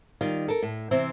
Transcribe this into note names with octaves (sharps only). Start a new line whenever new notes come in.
D#3 G3 F4
A4 A#4
A2
C3 E3 C4